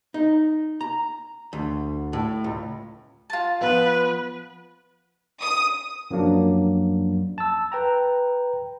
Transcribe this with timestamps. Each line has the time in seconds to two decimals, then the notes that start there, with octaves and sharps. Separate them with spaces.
0.14 D#4
0.81 A#5
1.53 D2
2.13 A2
2.44 C#2
3.30 F4 A5
3.61 F3 B3 B4
5.42 D#6
6.11 F#2 F3 F#3 A#3 D4
7.38 A5 E6
7.72 B4 G5 A#5